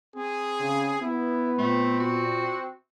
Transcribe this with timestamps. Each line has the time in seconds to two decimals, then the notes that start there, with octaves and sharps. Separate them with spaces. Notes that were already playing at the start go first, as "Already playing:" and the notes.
0.16 C4 G#4
0.60 C#3
1.02 B3 E4
1.59 A#2 A3 C4
2.00 F#4